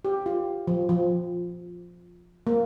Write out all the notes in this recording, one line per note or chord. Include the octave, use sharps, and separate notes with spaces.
G4
F4
F3
F3
A#3